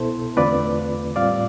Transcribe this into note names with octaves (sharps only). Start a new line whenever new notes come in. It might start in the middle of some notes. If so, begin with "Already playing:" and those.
Already playing: C2 B2 B3 E4 A4 C5
E2 D3 A3 C4 F4 B4 D5
A2 G3 C4 F4 D5 F5